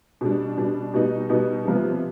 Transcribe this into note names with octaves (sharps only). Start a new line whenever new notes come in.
B2 G3 D4
B2 G3 D4
B2 G3 B3 D#4
B2 G3 B3 D#4
C3 F3 B3